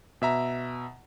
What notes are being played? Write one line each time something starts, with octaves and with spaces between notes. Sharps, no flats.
B2 E5 A#5